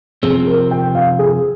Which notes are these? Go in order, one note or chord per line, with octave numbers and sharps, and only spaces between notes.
C3 F3 C4 G#4
A#4
G5
F5
G#4